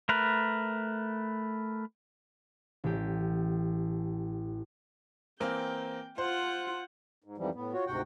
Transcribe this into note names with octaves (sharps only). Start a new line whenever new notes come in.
A3 A#4 B4
A1 G4
E3 A#3 C4 G5
F4 C5 F#5
G#2
F2 G#2 E3 F3 G3
A2 B3
F4 F#4 C#5
D2 G#2 C3 F#4 F#5 G5